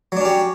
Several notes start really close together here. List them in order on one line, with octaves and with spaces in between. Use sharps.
F#3 D4 C#4 G4